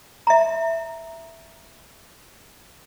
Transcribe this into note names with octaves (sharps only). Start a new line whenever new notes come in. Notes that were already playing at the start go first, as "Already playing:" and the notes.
E5 A#5